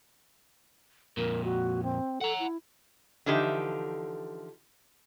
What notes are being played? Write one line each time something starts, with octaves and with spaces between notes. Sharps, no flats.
F2 A#2 A#4
F#4
C4
A4 F#5 A#5
E4
D3 E3 F3 D#4 G4 E5